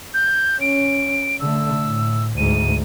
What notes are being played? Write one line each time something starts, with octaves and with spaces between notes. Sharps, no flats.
G6
C#4 D7
D3 A3 E6
A2
D2 G#2 D#7